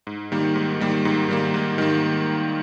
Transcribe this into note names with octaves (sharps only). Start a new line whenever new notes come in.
G#2
D#3 G3 A#3
G#2
D#3 G3 A#3
G#2
D#3 G3 A#3
G#2
D#3 G3 A#3